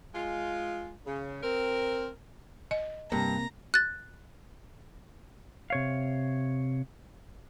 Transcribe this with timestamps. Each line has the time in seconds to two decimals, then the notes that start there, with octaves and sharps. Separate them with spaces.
0.15 G#3 F4
1.07 C#3
1.43 C4 A#4
2.71 D#5
3.12 G2 C3 A#3 A#5
3.74 F#6 A6
5.70 C3 C#5 F5